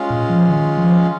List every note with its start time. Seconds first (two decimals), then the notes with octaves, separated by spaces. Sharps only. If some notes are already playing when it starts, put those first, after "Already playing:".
Already playing: G#3 C#4 F4
0.10 A#2
0.30 F3
0.49 D#3
0.78 F3